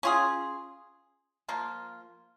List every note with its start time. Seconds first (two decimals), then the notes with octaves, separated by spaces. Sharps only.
0.03 C#4 F4 G#4
1.48 F3 A#3 F4